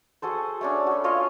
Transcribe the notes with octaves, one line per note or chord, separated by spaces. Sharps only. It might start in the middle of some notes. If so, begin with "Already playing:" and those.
F#4 G#4 A4 C5
A3 C#4 D4
F#4 B5
F4 C#5 D#5 F5